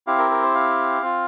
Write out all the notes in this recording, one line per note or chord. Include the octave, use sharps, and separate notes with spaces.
C4 E4 G4 F5
A#4
A#4
C5
F5
C4 F4